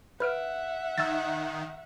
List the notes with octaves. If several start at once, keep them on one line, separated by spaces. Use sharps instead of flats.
B4 E5 F#5 F6 D7
D#3 E6 G#6 A6